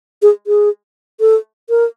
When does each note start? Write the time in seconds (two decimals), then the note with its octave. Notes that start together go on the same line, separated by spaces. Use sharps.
0.22 G#4
0.47 G#4
1.20 A4
1.70 A#4